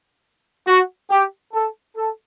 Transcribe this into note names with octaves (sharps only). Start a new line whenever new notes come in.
F#4
G4
A4
A4